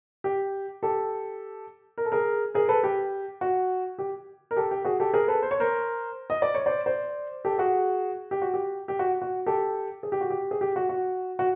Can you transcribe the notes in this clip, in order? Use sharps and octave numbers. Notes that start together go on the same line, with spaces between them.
G4
G4 A4
A#4
A4
G#4 A#4
G#4 A#4
A4 B4
G4
F#4
G4
A#4
G4 A4
G4
F#4 G#4
G4 A4
G#4 A#4
A4 B4
C5
C#5
A#4 C5
D#5
D5
C#5
C5 D5
C5 D5
G4 A4
F#4 G#4
G4
F#4
G4
G4
F#4
F#4
G4 A4
G#4
G4
F#4
G4
G#4
G4
F#4
F#4
F#4